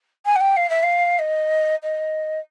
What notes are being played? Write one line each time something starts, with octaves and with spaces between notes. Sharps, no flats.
G#5
F#5
G5
F5
E5
F5
D#5
D#5